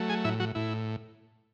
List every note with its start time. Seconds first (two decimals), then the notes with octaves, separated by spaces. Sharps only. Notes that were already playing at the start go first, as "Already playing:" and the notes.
Already playing: F#3 A3
0.09 G#4 G#5
0.24 A2 E4 E5
0.40 F#3 F#4
0.55 A2 E4